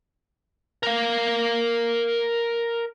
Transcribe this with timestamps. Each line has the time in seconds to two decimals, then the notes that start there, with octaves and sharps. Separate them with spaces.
0.83 A#4 F5